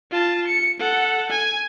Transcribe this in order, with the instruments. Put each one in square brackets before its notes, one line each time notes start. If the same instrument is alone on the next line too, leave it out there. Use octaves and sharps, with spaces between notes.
[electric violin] F4 A5
C#7
A4 F#5
G#5